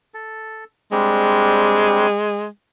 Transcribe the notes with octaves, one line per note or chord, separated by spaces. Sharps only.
A4
G3 G#3 C4 D4